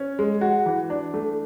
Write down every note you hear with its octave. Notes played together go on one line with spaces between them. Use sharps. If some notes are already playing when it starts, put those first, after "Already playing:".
Already playing: C#4
G#3
F#4
E3
D4
A3